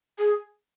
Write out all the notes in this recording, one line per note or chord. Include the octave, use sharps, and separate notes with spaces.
G#4